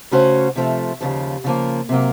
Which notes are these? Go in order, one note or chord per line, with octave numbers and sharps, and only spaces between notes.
C#3 A3 C#4 F#4 C5
C3 F3 A3
D#2 C#3 F3
C#3 F3 A#3
C3 F#3 A#3